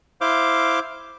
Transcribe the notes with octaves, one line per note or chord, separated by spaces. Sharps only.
E4 C5 F5 D6